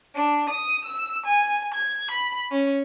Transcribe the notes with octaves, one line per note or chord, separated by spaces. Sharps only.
D4
D#6
E6
G#5
G#6
B5
C#4